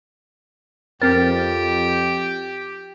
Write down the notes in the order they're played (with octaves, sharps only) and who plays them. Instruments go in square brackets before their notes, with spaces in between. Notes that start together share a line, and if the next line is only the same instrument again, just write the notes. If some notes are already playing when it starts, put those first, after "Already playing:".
[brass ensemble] F2 [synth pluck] C4 A#4 [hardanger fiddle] G4 [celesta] A6